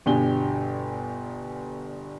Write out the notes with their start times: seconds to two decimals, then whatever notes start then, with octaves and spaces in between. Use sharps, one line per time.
0.06 G1 B2 D4 G4 G#5 G7